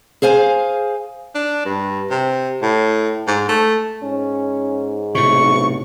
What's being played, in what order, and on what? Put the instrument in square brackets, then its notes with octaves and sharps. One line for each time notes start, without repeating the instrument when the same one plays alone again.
[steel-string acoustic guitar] G#4 C5 F5 G#5
[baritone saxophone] D4
G2
C3
A2
G#2
A3
[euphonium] G#2 [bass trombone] C#4
[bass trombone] B1 [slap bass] A2 C3 [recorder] C#6